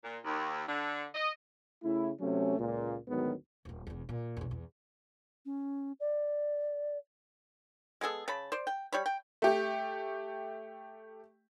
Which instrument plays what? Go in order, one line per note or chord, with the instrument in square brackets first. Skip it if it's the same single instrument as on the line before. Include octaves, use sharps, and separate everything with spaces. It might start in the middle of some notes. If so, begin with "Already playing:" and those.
[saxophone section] A#2
D#2
D3
D#5
[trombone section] C#3 A3 E4
C3 F#3 A3 C#4
C#2 A#2
D2 G#2 D#3 F#3 B3
[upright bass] D#1 A#3
E1 E2
A#2
B1 E2
E2
[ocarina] C#4
D5
[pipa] G#3 B3 G#4 A4
C#3 A5 B5
C5 D5
G5
G3 C#5 B5
G5
[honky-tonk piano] A3 G4